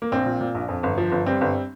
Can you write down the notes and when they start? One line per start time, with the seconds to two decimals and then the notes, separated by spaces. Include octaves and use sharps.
0.02 A#3
0.12 A#1 C4
0.26 A#2
0.41 A#2
0.55 A#1
0.68 F2
0.83 G1
0.98 F3
1.12 G1
1.26 G3 C4
1.41 G1